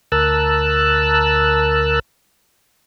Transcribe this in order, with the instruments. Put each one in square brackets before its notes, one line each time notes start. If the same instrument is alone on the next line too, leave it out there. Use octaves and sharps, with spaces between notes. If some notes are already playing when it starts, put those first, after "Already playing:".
[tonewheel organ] D2 A#4 A5 E6 F#6